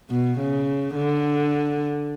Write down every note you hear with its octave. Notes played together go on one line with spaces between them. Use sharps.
B2
C#3
D3